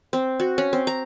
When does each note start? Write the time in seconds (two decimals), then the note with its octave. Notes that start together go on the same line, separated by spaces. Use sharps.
0.13 C4
0.40 F#4
0.58 C#4
0.73 C4
0.87 A#5